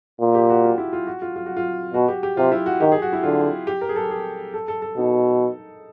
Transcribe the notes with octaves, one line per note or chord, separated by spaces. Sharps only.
A#2
G4
F#4
F4
E4
F4
F#4
F4
F4
F#4
F4
B2 F#4
G4
G4
C3 F4
E4
F#4
D#3 G4
G#4
F#4
E4
D3 F4
G4
A#4
G#4
A4
G#4
A4
A4
A4
B2 D#4